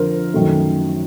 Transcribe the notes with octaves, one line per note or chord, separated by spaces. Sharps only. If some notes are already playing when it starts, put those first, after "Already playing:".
Already playing: F2 D3 F3 A#4 C5
F#2 D#3 F#3 A3